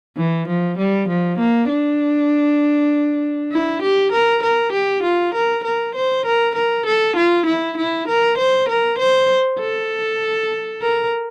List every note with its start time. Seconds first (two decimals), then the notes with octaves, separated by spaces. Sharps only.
0.17 E3
0.48 F3
0.78 G3
1.09 F3
1.39 A#3
1.69 D4
3.52 E4
3.82 G4
4.12 A#4
4.43 A#4
4.73 G4
5.03 F4
5.34 A#4
5.64 A#4
5.95 C5
6.26 A#4
6.55 A#4
6.86 A4
7.17 F4
7.46 E4
7.78 E4
8.08 A#4
8.38 C5
8.69 A#4
8.99 C5
9.60 A4
10.82 A#4